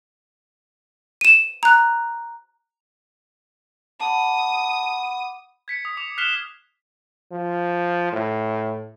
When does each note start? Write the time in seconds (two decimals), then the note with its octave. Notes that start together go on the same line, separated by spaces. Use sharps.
1.21 D#7 E7
1.63 A#5 F#6
4.00 F#5 A5 B5 D6 D#6
5.68 G#6 B6 C#7
5.85 D#6
5.97 D6 F7
6.18 F6 F#6 B6 C7 E7 G7
7.32 F3
8.13 A2